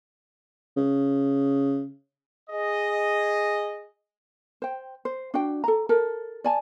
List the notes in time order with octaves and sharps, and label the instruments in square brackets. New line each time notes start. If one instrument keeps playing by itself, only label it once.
[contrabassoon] C#3
[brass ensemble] G#4 D#5
[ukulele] C5 G5
C5
D4 F#4 G5
A4 A#5
A4 A#4
D5 G#5 A5